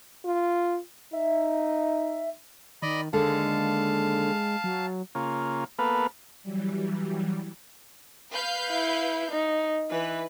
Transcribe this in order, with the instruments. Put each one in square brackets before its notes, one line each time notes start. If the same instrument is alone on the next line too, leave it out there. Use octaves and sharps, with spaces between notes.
[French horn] F4
[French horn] D#4 [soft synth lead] E5
[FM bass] D#3 [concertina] D5 D#5 B5
[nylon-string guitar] D#2 D3 [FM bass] G#3 [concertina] F5 A5
[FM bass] F#3
[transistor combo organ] C#3 A#3 F4
A#3 B3 A4 B4 F5
[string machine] E3 F#3 G3
[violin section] B4 F5 G6
[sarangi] E4
D#4
[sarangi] E3 [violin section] B4